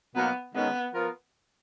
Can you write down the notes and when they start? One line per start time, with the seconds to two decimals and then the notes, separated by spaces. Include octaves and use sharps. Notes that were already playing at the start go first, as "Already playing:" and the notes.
0.16 B2 F#3 A#3 B3 D#4
0.55 D#3 G#3 B3 C#4
0.94 F3 B3 F4 A#4